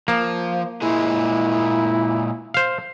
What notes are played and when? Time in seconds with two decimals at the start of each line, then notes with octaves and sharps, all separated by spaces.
0.08 F3 A#3
0.82 A#2 G#3 E4 G#4
2.54 C5 F5